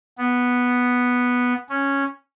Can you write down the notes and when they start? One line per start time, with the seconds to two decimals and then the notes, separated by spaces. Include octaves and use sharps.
0.18 B3
1.69 C#4